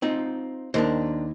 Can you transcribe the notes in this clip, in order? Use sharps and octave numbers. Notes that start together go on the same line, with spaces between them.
C4 D#4 F4
D#2 D4 A#4 C5